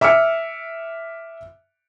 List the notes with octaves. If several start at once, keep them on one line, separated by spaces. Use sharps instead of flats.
E5 D6 E6 F6 C#7